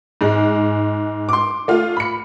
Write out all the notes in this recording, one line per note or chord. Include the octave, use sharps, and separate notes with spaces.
G#2 G#3
C6 D6
A3 F4
B5 C#7